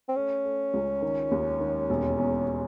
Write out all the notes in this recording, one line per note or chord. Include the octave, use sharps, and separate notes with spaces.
C4
A3 C#4
A3
C#2
D#3
D#2
D#3
E1
E2